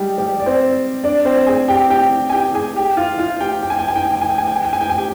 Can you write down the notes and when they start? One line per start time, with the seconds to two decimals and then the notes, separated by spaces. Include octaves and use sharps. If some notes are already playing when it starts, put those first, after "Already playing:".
Already playing: G3 G#3 G4
0.18 G3 G4
0.40 D5
0.46 C4 C5
1.04 D4 D5
1.25 C4 C5
1.47 G#4 G#5
1.68 G4 G5
1.90 G4 G5
2.30 G#5
2.33 G4 G5
2.54 G#4 G#5
2.76 G4 G5
2.97 F4 F5
3.19 F4 F5
3.41 G4 G5
3.63 G5
3.70 G#5
3.79 G5
3.88 G#5
3.96 G5
4.04 G#5
4.13 G5
4.21 G#5
4.30 G5
4.38 G#5
4.47 G5
4.56 G#5
4.64 G5
4.73 G#5
4.81 G5
4.89 G#5
4.98 G4 G5